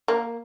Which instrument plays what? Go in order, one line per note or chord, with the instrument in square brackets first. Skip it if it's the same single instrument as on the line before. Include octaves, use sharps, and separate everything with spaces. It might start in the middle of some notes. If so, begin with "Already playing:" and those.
[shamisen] A#3